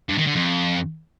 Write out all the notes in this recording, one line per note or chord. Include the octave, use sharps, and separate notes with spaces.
G2
D#3
D3
F2